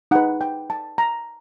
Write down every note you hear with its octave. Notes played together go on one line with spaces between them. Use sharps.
D#4 G#4 B4 F#5
G5
A5
A#5